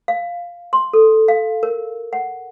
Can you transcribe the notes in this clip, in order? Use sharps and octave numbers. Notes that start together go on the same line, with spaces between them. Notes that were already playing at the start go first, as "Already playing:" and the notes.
F5
C6
A4
F5
A#4
F#5